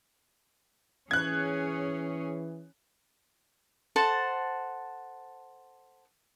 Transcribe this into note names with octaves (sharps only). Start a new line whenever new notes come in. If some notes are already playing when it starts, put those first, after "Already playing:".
E3 C#4 G#4 C#5 F#6 G#6
A4 C5 F#5 A5